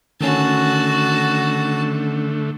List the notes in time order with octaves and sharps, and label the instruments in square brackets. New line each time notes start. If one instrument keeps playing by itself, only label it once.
[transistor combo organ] D3 A3 [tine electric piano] D#3 C#4 [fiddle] F#4 A5